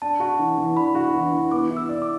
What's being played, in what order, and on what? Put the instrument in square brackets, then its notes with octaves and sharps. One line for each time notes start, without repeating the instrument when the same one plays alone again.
[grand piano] D4 [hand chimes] A5
[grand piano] F#4
E3
E3
[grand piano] D4 [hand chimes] B5
[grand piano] F#4
E3
E3
[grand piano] B3 [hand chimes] D6
[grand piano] E4
[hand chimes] E6
[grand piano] D5
[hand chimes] D6